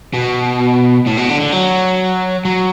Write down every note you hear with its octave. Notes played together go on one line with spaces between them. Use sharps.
B2
A2
B2
D3
D3
F#3
F#3